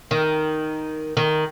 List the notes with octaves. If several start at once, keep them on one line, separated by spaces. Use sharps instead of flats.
D#3
D#3